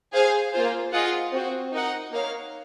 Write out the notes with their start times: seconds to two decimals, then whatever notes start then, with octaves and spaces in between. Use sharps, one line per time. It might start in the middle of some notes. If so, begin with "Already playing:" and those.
0.13 G#4 C5 F5 G#5
0.53 A#3 F4 C5
0.93 F4 G#4 D#5 F#5
1.32 C4 F#4 C5
1.71 D#4 A#4 D#5 F#5
2.11 A#3 D#4 A#4 C#5 F5